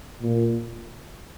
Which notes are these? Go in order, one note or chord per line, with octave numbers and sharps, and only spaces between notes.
A#2